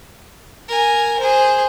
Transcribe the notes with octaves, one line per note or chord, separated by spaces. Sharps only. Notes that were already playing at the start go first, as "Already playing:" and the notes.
A#4 G#5
G#4 C5